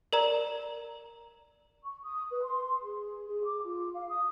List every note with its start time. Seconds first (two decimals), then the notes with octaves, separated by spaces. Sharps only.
0.13 A#4 D5 A#5
1.84 C#6
2.03 D#6
2.30 B4
2.43 C6
2.82 G#4
3.26 G#4
3.44 D6
3.62 F4
3.93 F5
4.08 D#6